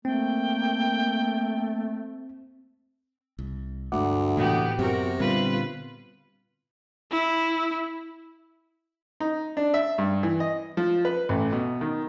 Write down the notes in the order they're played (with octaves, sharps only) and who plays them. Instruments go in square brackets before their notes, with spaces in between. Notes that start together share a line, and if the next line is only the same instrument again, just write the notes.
[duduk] A3 [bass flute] A#3 [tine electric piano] C4 [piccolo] G5
[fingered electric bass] C2
[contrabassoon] D2 [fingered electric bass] G2 G#3 A3 [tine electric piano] E5 F#5 D6
[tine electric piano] A2 [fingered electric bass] C3 E3 A#3 [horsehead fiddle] B3 G4
[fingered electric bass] F#2 F#3 B3 [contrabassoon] C3 [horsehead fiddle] F#4 A#4
[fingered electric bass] A#2 D3 B3 [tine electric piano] G3 C4 [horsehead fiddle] F4 B4
[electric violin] E4
[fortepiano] D#4
D4
E5
G2
E3
D#5
F3
B4
A1
B2
D#3